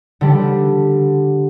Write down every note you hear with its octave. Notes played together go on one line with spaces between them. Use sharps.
D3 G3